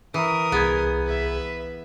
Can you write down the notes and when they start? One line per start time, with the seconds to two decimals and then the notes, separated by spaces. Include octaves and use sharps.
0.14 E3 A#4 D#6
0.52 C2 B3 G#4 G#6
1.06 B4 E5